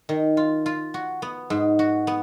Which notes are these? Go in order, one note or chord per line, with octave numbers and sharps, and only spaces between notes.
D#3
F4
F4
F#4
B3
G#2
F#4
B3